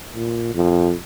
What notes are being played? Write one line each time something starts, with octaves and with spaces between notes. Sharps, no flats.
A#2
F2